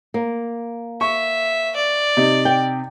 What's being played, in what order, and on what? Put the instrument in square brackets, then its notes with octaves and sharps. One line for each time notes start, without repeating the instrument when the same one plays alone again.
[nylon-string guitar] A#3
[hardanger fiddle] E5 [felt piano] C#6
[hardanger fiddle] D5
[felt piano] C3 D#4
[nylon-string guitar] G5